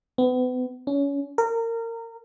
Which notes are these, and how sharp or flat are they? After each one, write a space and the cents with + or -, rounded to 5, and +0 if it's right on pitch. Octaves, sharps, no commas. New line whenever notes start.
B3 +35
C#4 +25
A#4 -25